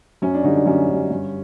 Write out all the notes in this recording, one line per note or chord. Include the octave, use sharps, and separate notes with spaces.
F#2 C#4
D4
D3 G3 D#4
D4
F#2 C#4
D3 G3
G2